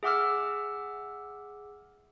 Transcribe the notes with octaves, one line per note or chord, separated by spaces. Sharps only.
G#4 E5 F#5 D6 E6 F6